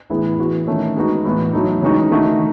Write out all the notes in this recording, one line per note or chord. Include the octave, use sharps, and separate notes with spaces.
A2 E3 B3 E4 G#4
E3 B3 F#4
D#3 A3 C#4
G#3 B3 D#4 F#4
A2 E3 B3
F#3 A3 D#4
C#3 E3 G#3 D#4 F#4
D#3 A3 D#4 F#4